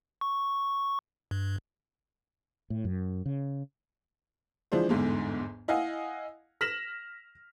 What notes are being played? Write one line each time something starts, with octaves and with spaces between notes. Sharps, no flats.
C#6
G2
A2
F#2
C#3
E3 F3 G#3 D4 C5
G1 E2 G#2 D3
E4 D#5 F5 F#5 G#5
F6 A#6 B6 E7 F#7